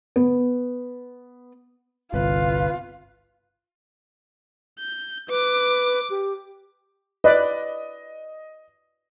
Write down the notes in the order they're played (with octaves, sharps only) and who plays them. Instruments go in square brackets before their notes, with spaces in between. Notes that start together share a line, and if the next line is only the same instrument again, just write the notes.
[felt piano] B3
[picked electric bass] G1 C2 [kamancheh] F4 [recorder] B4
[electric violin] G6
[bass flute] B4 [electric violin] D6
[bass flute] G4
[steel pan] B4 D5 [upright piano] D#5